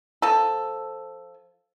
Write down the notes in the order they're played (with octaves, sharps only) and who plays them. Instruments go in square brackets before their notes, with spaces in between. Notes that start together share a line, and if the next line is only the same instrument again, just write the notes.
[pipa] F3 A4